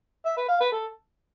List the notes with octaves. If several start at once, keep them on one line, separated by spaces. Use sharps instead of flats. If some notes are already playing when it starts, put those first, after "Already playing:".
E5
B4
F5
B4
A4